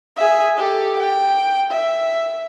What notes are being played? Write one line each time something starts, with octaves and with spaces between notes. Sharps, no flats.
G#4 E5
G4 A4
G5
E5